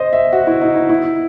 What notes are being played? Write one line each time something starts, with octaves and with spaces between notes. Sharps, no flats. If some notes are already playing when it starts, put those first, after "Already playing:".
Already playing: C5 D#5
E5
F#4
E4
D#4
E4
E4